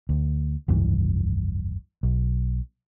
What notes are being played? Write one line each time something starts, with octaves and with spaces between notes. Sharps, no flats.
D2
F1 C#2 G2 E3
B1